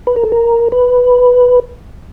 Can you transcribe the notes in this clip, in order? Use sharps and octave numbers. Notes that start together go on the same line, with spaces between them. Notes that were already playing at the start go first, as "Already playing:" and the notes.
B4
A#4
A4
A#4
B4